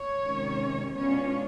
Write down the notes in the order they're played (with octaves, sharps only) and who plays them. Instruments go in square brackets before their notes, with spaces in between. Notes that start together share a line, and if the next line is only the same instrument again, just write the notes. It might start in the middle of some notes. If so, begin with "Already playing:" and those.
Already playing: [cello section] C#5
C3 D#3 G#3 C#4
B2 G#3 B3 C#4 D4 F4 C#5